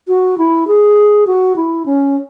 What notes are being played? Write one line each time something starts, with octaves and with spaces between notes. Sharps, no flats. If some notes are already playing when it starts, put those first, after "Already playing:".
F#4
E4
G#4
F#4
E4
C#4